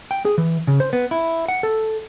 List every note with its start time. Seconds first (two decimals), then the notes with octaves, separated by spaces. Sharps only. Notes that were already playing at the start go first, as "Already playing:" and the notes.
0.11 G5
0.25 G#4
0.38 E3
0.67 C#3
0.80 C5
0.93 B3
1.11 E4
1.48 F#5
1.63 A4